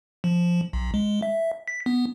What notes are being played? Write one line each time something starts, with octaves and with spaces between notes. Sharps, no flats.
F3
B1
G#3
E5
B6
B3